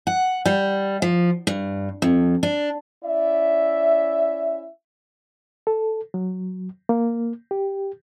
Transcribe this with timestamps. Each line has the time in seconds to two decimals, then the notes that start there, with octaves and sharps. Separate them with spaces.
0.07 F#5
0.46 G3
1.02 F3
1.47 G2
2.02 F2
2.43 D4
3.04 C#4 E4 D5 E5
5.67 A4
6.14 F#3
6.89 A#3
7.51 G4